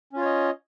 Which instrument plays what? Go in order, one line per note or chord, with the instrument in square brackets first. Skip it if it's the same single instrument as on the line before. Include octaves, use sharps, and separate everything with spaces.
[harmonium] C#4
F4
C#5
D#5